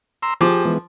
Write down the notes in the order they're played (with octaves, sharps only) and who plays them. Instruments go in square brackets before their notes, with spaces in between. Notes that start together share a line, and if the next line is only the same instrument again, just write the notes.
[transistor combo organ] A#5 C6 E6
[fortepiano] F3 D6 [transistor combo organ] G4 G#4
[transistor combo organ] E3 G#3 B3